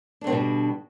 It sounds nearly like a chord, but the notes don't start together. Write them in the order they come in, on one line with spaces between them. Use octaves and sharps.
D4 D3 C4 B2 G3